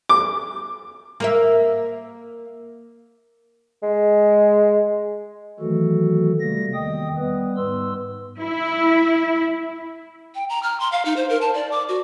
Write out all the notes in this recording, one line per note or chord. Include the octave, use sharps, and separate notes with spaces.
D6
A#3 A#4 E5
G#3
D#3 E3 F#3 A3 F#4 A4
C3 G3 A3 A#3 A#6
E2 D#3 D#5 G5 D#6
G3 B3 B4
G#2 B4 C6 E6
E4
G5
A#5
F6
C6
F5
D#4
C5
A#4
A5
D5
D6
F#4